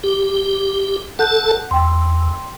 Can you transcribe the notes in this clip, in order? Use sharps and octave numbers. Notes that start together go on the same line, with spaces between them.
G4
A4 F#5 A5 F#6 G6
E2 G5 C6